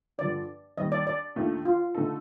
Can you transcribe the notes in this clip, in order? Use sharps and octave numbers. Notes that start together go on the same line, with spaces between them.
G2 D3 F3 D5
D#2 D#3 G3 C4 D#5
D5
D5
D#2 D#3 A3 D4 F4
F4
D3 A3 D#4 A4